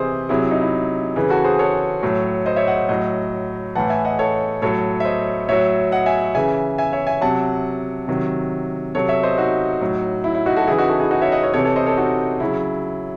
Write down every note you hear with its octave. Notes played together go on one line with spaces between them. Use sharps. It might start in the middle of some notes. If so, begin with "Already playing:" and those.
Already playing: C3 E3 G#4 C5 D#5
C3 F#3 E4 G#4
E4
D#4
E4
C#3 E3
F#4 A4
G#4 C5
A4 C#5
A2 F#3
C5 D#5
C#5 E5
D#5 F#5
A2 F#3 D#5 F#5
A2 E3 F#5 A5
E5 G#5
D#5 F#5
A4 C#5
A2 F#3 A4 C#5
E5
C5 D#5
A2 F#3 C#5 E5
D#5 F#5
E5 G#5
C#3 E3 E5 G#5
E5 G#5
C#5 E5
E5 G#5
C3 F#3 F#5 A5
C3 D#3 F#3
C3 F#3 A4 C#5
C#5 E5
C5 D#5
D#4 F#4
A2 F#3
E4
E4
D#4 F#4
F#4 A4
C#3 E3 E4 G#4
D#4 F#4
F#4 A4
E4 G#4
D#4 F#4
C#5 E5
D#5 F#5
C#5 E5
C3 E3 A4 C#5
A4 C#5
C5 D#5
A4 C#5
D#4 F#4
C#3 F#3 E4